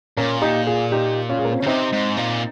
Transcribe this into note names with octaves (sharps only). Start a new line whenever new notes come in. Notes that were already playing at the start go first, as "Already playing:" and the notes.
A#2 A#3 C#4
D#4 G4
F4 G#4
D#4 G4
C#4 F4
G#3
A#3
C4
C#4
C#3
C3 C4 D#4
G#2
A#2